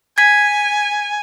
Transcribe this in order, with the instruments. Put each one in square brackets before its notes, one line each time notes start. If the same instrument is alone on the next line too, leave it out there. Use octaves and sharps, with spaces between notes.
[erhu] G#5 [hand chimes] G#6 B6